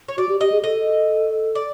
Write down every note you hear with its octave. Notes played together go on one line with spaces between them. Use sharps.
C#5
F#4 D5
G4
G4 D#5
G#4
A4 D#5
D5